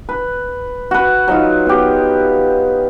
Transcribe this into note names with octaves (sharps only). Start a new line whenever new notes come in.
B4
F#4 B4
F#3 D#4 F4
B3 G4